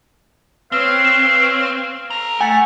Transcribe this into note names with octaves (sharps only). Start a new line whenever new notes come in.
C4 B4 C#5 F5
A4 A#5
A3 F#5 G#5